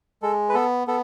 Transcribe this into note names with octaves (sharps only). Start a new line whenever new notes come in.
G#3 A4
B4
B3 A4
B3 A4